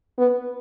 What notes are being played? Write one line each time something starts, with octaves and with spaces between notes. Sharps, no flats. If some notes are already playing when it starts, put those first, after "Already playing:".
B3